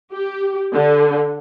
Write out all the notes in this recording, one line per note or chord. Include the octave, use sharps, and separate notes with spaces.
G4
D3